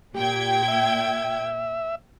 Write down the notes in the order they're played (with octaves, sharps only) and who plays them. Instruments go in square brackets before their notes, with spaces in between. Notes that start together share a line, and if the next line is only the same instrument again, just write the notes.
[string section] A#2 G5 G#6 [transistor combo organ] G4
[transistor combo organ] E5